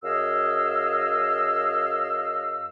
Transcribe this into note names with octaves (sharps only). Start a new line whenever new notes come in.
F#2 G#4 D#5 F5 E6